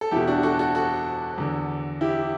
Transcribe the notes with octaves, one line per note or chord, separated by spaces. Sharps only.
A4
E2 B2 E4 G4
D4 F#4
F#4 A4
F#4 A4
F#4 A4
E2 D3
E4 G4